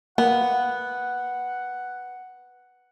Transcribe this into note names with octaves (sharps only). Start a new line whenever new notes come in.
A#3 B3 F#5